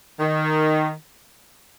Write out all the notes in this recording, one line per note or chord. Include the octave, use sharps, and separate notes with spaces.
D#3